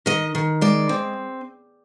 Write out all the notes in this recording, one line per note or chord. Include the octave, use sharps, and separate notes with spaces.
D#3 D#5
D#3
G#3 D5
C4